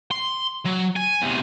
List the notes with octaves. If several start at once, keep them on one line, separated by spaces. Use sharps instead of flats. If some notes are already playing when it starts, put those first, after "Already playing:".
C6
F#3
G#5
E2 C3